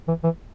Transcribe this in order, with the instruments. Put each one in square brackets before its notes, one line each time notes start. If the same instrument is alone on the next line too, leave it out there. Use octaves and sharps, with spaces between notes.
[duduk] E3
E3